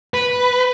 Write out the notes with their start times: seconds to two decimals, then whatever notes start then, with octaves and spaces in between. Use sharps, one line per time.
0.14 B4